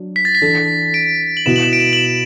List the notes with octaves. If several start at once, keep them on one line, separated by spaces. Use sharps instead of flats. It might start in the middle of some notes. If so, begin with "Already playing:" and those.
Already playing: F#3 D4
B6
A6
B6
E3 D4 A4
D7
F#7
B2 B3 E4 E7
F#7
E7
D7
E7
F#7
E7